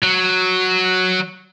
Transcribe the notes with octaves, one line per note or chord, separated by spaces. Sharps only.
F#3